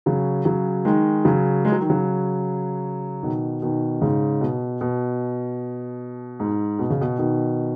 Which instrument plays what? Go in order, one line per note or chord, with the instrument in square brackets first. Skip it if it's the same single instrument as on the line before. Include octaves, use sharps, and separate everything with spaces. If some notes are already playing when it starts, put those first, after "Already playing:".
[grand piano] C#3 F#3
C#3 F#3
D#3 G#3
C#3 F#3
G#3
F#3
D#3
C#3 F#3
B2 D#3
B2 D#3
G#2 C#3
B2
B2
G#2
B2
C#3
B2
B2 D#3